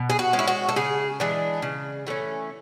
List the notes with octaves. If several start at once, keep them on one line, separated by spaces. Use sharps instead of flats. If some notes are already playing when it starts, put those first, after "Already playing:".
Already playing: B2
G#4
F#4
G#3 C#4
E4
F#4
A4
C#3 G#4
E3 G#3 D4
C#3
E3 A3 C#4